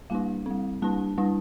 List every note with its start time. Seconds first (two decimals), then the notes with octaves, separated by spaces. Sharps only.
0.10 G3 A#3 D4 F5
0.46 G3 C4
0.82 G3 A#3 D4 A5
1.18 G3 D4